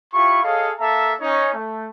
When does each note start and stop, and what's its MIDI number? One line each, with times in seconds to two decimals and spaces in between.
0.14 0.40 64
0.14 0.40 65
0.14 0.40 67
0.14 0.40 83
0.14 0.40 85
0.43 0.68 68
0.43 0.68 69
0.43 0.68 73
0.43 0.68 75
0.43 0.68 77
0.80 1.13 58
0.80 1.13 69
0.80 1.13 76
0.80 1.13 77
0.80 1.13 81
0.80 1.13 82
1.20 1.51 61
1.20 1.51 63
1.20 1.51 73
1.55 1.88 57